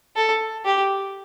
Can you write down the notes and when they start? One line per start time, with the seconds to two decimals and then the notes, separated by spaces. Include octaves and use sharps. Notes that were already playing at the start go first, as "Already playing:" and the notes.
0.16 A4
0.65 G4